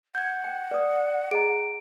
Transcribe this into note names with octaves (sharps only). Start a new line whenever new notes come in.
F#5 G6 G#6
G5
B4 D5 D#6
G#4 D#5 A#5 D7